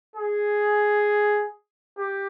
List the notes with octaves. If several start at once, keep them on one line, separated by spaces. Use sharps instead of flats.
G#4
G4